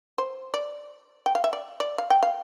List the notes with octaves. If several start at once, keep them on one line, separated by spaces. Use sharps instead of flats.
C5
D5
G5
F5
E5
D5
D5
F5
G5
F5